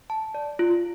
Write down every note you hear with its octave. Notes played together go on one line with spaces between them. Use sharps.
A5
D5
F4